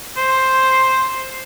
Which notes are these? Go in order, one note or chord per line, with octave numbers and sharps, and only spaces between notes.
C5